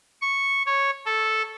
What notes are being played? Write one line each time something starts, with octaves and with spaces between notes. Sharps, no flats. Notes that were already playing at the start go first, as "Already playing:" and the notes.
C#6
C#5
A4